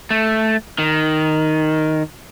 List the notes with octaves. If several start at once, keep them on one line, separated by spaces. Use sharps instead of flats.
A3
D#3